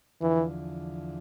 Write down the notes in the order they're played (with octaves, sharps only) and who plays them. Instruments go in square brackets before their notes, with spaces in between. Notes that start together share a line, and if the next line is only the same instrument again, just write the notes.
[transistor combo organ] E2 D3 F3 [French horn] E3